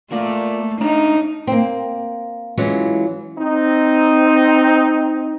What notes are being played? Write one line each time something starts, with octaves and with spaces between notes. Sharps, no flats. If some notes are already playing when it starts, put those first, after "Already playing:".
A3 A#3 F4 D5
D4 D#4 C#5 A#5
A#3 C4
E3 F#3 G#3 C#4 F4
C4 D#4